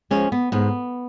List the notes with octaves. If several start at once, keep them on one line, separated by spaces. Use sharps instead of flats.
F3 G#3 C#4
B3
G#2 B3